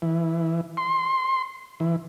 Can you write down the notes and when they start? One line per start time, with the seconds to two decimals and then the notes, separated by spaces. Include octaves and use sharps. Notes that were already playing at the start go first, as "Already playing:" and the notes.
0.02 E3
0.77 C6
1.80 E3